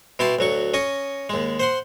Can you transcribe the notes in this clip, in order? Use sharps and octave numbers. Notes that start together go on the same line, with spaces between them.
B2 E4 G5 A5 C6
D2 F#3 C#6
C#4 D#5 C#6
D#2 G#3
C5 F#5 C6